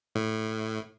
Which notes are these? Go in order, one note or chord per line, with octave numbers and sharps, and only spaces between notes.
A2